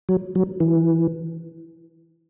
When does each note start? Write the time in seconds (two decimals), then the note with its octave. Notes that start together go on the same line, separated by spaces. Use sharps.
0.09 F#3
0.35 F#3
0.60 E3